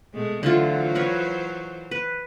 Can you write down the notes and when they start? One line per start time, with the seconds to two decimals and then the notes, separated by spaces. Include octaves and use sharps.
0.14 B2 G#3 A3
0.43 D3 E3 F#3 A3 F4 C5
0.95 A#4 B4 C#5
1.91 B4